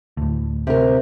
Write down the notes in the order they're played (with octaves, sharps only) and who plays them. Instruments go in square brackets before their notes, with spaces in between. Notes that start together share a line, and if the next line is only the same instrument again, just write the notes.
[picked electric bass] D2 A2
[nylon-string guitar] C3 A#4